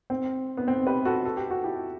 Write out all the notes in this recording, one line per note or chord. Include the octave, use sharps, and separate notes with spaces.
C4
B3
C4
G4 B4
F#4 A4
A4
G4
F#4
E4 G4